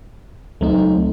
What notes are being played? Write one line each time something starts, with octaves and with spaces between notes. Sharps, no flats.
C#2 F#3 A3 C4 D#4